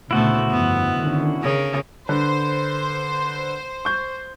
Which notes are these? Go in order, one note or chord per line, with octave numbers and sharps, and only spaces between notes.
D2 A#2 C#3 A3 B3 E4 F#4 C5
G1 F2 B3
D3 D#3 C#4
C#3 A#4
D3 B4 C5
C#6 G6